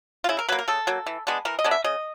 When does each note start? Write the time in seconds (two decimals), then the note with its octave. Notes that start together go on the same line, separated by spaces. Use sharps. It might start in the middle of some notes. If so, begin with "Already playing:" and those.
0.24 F4
0.29 C#3 E4
0.39 A#4
0.49 F#3 A#3 B4
0.59 A#4
0.68 C#3 A4
0.87 F#3 A#3
1.06 E3
1.27 G#3 B3 D4
1.45 E3 A#4
1.59 D#5
1.64 G#3 B3 D4
1.71 E5
1.84 C#3 D#5